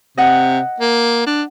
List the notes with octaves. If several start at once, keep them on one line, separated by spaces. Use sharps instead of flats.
C3 D#5 F#5
A#3
D4